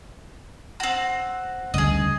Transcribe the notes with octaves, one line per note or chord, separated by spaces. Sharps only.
C4 F#4
D2 G2 C#3 G#4 D#5